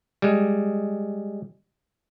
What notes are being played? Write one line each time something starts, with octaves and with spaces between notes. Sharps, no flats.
G3 G#3